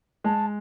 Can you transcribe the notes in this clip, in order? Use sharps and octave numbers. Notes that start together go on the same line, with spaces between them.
G#3 A5